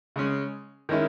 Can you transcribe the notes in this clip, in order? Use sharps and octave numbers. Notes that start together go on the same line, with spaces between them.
C#3 G#3 C#4
D#3 G#3 C#4 E4